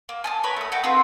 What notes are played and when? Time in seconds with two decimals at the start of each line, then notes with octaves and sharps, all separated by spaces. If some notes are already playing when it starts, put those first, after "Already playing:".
0.09 A#3
0.24 G#5 A5 D#6
0.43 A#4 B4 C#5 B5
0.56 A3 D#6
0.72 F#4 A4 G5
0.84 C4 F4 G#4 B4